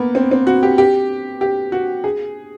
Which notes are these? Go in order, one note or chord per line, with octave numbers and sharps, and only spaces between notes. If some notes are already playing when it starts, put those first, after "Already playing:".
Already playing: A#3 B3
C4
C4
F#4
G4
G4
G4
F#4
G#4